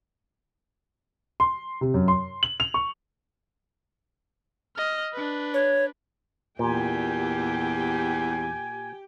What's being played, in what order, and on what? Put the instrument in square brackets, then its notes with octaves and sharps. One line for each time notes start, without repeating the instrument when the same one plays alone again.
[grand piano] C6
C3
F#2
C6
F#7
F7
C#6
[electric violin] D#5 F6
D4 B4
[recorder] C#5
[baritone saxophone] E2 [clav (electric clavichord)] A#2 [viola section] G4 G5 [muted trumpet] G#5